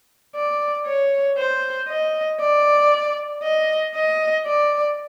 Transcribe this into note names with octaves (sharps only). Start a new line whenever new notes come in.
D5
C#5
C5
D#5
D5
D#5
D#5
D5